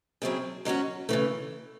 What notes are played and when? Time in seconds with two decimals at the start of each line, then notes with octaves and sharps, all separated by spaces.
0.22 C#3 F#3 C4 E4 G#4
0.65 G#2 F#3 C#4 F#4
1.09 C#3 E3 A3